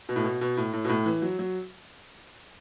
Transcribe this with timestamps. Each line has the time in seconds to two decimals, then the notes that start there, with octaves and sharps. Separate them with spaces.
0.09 B2
0.16 A2
0.24 B2
0.41 B2
0.57 A2
0.73 A2
0.85 B2
0.89 A2
1.06 E3
1.22 F#3
1.39 F#3